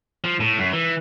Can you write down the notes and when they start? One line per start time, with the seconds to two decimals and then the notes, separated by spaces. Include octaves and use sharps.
0.24 F3
0.40 A2
0.59 F#2
0.73 E3